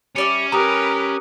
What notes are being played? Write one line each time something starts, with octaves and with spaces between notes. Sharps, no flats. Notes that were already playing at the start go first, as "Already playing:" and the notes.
G3 C#4 D5 E5 C#7
G3 A#4 B4 A#5 D6 D#6